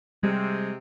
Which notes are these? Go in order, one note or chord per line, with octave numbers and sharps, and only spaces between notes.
C3 G3 G#3